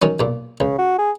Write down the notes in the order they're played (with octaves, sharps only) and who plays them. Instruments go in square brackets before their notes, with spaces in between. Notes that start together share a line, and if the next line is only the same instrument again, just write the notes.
[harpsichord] D#3 F#3 C#4
B1 A#2
[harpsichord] C#2 [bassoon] C#3
[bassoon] F#4
G#4